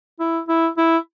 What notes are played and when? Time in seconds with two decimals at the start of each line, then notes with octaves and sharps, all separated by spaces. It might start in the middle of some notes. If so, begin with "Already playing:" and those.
0.20 E4
0.48 E4
0.77 E4